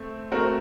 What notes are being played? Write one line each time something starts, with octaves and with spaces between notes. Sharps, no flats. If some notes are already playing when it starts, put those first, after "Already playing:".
Already playing: A3 C4
A3 C4 F#4 A#4